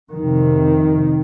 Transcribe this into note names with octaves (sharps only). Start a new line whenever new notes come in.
F2 D#3
C3